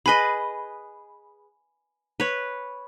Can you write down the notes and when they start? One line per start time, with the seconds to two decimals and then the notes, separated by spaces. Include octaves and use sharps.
0.06 G#4 B4 D#5 G#5 B5
2.20 B4 C#5